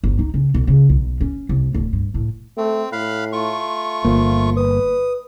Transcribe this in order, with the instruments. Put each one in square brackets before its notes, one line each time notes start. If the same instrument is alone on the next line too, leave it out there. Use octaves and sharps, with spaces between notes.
[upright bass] G1
D#4
C#3
B1
C#3
B1
C#4
C2
D1
G2
A2
[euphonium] A3 [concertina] C4
[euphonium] A2 [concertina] F5 B5 F#6
[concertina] A3 F4 C#6
[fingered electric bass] G1 A#3 [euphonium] F3
[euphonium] B4 [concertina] D#6